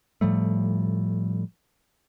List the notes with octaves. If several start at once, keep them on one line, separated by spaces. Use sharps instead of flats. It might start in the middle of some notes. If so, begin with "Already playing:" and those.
A2 F3 G3 A3